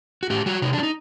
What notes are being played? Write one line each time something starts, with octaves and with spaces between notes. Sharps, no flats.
F#4
A2 G4
G3 F#4
C3 D#4
D4
F#3
D#4